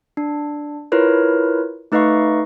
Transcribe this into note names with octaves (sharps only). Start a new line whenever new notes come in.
D4
E4 F4 A#4 B4 C#5
A3 D#4 B4 D#5 F5 C#6